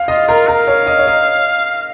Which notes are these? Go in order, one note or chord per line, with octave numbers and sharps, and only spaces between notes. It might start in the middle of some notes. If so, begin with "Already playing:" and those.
Already playing: F5
F4 D#5
F4 A#4
A#4 F5
C#5
D#5
C#5
D#5